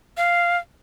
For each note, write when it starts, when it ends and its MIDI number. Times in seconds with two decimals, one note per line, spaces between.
0.17 0.57 77